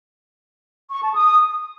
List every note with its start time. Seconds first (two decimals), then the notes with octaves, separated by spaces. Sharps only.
0.92 C#6
1.04 A5
1.16 D#6